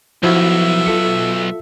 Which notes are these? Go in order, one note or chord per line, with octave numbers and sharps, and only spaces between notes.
B1 F3 E4 F#4 E5
F4 A4 C#7